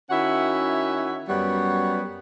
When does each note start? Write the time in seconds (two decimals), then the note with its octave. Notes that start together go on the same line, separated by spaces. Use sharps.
0.10 D#3 C#4 E4 F#4 E5 F#5
1.29 F#2 G3 B3 C#5 F#5